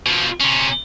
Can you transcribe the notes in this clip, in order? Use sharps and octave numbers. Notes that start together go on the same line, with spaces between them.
B2 F3
C3 C#4